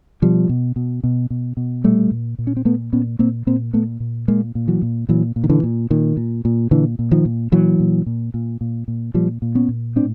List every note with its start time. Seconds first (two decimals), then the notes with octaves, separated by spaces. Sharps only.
0.22 B2 F3 G3
0.49 B2
0.76 B2
1.04 B2
1.30 B2
1.57 B2
1.84 A#2 G3 A3
2.11 A#2
2.39 A#2
2.47 C#4
2.57 C4
2.65 A#2 A3 B3
2.93 A#2 B3 C#4
3.19 A#2 A#3 C4
3.47 A#2 A#3 C4
3.73 A#2 A3 B3
4.00 A#2
4.28 A#2 G#3 A#3
4.55 A#2
4.68 E3 F#3
4.82 A#2
5.09 A#2 E3 F#3
5.36 A#2
5.44 D#3
5.50 D3 E3
5.64 A#2
5.90 A#2 D#3
6.17 A#2
6.45 A#2
6.71 A#2 D3 E3
6.99 A#2
7.11 D#3 F3
7.25 A#2
7.52 A#2 E3 F#3
7.80 A#2
8.06 A#2
8.34 A#2
8.61 A#2
8.88 A#2
9.14 A#2 F3 G3
9.42 A#2
9.55 B3 C#4
9.68 A#2
9.96 A2 C4 D4